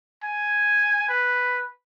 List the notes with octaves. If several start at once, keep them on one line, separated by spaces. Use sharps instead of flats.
G#5
B4